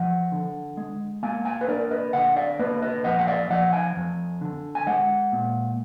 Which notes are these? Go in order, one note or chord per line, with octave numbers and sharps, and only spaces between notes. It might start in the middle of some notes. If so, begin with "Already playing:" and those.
Already playing: F3 D#5 F#5
D3
G#3
A#3 F5 G#5
F5 G#5
B4
D4 A#4 D5
B4 D#5
D3 D#5 F#5
D5 F5
A#3 B4 D#5
B4 D#5
F2 D#5 F#5
F#5
D5 F5
F3 D#5 F#5
F5 G#5
F2
D3
G#5
G#3 D#5 F#5
A#2